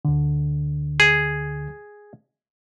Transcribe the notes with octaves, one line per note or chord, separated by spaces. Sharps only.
D2 D3
G#4